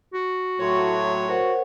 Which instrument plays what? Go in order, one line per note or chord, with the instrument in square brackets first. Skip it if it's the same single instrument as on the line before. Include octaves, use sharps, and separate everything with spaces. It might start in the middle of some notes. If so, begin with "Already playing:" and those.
[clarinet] F#4
[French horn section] A2 F#3 [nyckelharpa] C#5 [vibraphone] C6
[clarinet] F#4 [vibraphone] A#4 C5 F#5